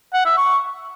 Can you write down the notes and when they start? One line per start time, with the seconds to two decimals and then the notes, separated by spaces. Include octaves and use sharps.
0.13 F#5
0.25 E5
0.37 C#6